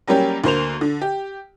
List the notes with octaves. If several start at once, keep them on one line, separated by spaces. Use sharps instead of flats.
F#3 G3 A#3 C#4 G4
D2 A#3 C5 F7
D3
G4